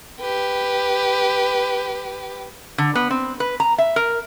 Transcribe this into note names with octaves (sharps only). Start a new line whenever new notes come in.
G4 B4
D3
B3
C4
B4
A#5
E5
A#4